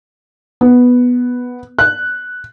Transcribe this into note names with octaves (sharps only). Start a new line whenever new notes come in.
B3
F#6